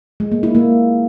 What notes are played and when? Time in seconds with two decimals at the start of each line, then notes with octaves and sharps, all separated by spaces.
0.20 G#3
0.32 A#3
0.43 E4
0.55 A#3